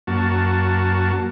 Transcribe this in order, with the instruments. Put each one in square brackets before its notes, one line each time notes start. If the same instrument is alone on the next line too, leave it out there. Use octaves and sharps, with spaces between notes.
[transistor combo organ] F#2 A#3 F#4 A5